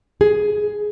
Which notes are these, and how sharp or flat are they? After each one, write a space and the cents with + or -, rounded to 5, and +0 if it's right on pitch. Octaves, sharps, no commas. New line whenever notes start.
G#4 +10